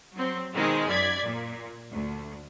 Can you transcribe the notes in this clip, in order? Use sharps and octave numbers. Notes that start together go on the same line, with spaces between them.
F#3 C4
B2 D#3 G#3 C4
F#2 D5 G#6 B6
A#2
D2